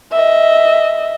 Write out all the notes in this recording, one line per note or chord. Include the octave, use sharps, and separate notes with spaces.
D#5 E5